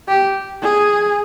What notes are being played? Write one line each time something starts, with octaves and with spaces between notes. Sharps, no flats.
G4
G#4